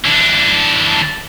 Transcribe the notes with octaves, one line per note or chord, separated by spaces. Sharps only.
E3 D4